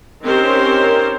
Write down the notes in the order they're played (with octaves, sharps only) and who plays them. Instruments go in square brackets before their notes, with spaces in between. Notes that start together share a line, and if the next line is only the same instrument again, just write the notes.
[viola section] D#3 C4 C#4 G4 A#4 C5